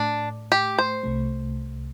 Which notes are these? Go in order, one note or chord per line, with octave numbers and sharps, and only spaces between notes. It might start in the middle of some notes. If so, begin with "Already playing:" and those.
Already playing: A2 A3 D4
G4
C5
C2 C3 A3